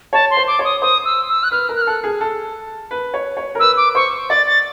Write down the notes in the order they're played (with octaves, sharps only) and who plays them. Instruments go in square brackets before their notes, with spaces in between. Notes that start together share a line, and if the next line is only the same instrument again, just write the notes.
[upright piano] C#5 [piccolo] A5
[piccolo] C6
[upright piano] C5
[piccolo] D6
[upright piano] C#5
[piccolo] D#6
[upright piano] C5 [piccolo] D#6
[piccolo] E6
E6
F#6
[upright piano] B4 [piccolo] F6
[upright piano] A#4
[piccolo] F#6
F6
[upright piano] A4 [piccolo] F#6
[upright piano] G#4
A4
B4
C#5
C#5
A#4
[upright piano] B4 [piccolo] E6
[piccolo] D6
[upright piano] C5 [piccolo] C#6
[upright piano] D5 [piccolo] A6
[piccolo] A6